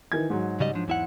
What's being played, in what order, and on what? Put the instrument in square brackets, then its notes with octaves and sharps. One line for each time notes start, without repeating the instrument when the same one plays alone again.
[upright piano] D#3 E3 G#6
G#2 F#3
[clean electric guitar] C#3 G3 D#5
F3 D4
E2 E4 F#5